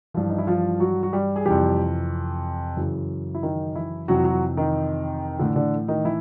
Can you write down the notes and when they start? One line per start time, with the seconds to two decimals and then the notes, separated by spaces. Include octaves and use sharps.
0.14 G2 E3 F3 F4
0.30 D#4
0.38 E4
0.47 F3 F4
0.80 F#3 F#4
1.03 F#4
1.13 G3 G4
1.36 G#4
1.45 F2 C3 E3 G3 G4
2.77 F#2 C#3 E3
3.35 E4
3.43 D#3 D#4
3.75 E3 E4
4.08 F2 C3 E3 F#3 F#4
4.24 F#3 F#4
4.57 D#3 D#4
5.39 A2 D3 E3 D4
5.56 D3 D4
5.88 D#3 D#4
6.05 E3 E4